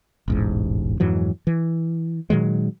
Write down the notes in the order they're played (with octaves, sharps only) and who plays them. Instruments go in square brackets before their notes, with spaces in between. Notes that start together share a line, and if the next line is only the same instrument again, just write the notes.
[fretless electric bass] E1 A1 G#2
F2 G#2 E3 F#3
E3
A#2 D#3 F#3 G#3